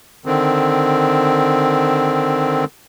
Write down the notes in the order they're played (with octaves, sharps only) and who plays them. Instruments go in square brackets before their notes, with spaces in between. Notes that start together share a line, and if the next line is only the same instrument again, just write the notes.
[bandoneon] D3 D#3 C4